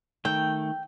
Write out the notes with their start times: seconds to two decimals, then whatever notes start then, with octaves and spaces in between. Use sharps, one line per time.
0.25 D#3 A3 G5